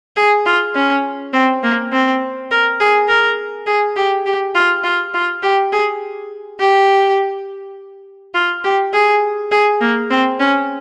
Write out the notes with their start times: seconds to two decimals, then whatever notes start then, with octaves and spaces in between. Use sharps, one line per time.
0.16 G#4
0.46 F4
0.75 C#4
1.33 C4
1.63 A#3
1.92 C4
2.51 A#4
2.80 G#4
3.08 A#4
3.67 G#4
3.96 G4
4.26 G4
4.55 F4
4.84 F4
5.14 F4
5.43 G4
5.72 G#4
6.60 G4
8.34 F4
8.64 G4
8.93 G#4
9.51 G#4
9.81 A#3
10.10 C4
10.40 C#4